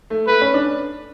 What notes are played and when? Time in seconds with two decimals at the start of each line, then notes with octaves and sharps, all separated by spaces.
0.10 A3
0.27 A3 B4
0.41 C#4
0.54 D4